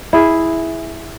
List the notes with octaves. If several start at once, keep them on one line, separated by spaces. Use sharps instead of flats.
E4 G#4